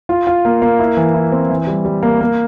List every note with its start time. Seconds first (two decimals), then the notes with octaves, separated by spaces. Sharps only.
0.09 F4
0.27 F4
0.45 A#3
0.62 A#3
0.79 E4
0.97 E3
1.14 E4
1.32 C4
1.49 E3
1.67 G3
1.85 G3
2.03 A#3
2.21 A#3